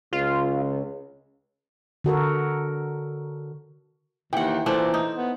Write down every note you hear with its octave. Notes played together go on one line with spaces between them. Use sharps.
C#2 C#3 F4
D3 F#4 A4 A#4
D#2 E3 F#5 G5
A#2 E3 A3 D4 C5
D#4
B3